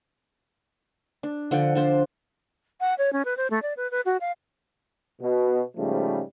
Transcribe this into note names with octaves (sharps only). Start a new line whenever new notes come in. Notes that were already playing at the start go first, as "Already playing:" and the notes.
D4
D3 F3 F#5 G5
F3 D4 C5
F#5
C#5
C#4
B4
C5
A3
D5
B4
B4
F#4
F5
B2
G#2 C#3 F3 G3 A3